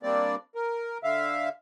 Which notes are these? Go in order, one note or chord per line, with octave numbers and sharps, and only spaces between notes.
G3 A#3 C4 D4 D5
A#4
D3 E5 F5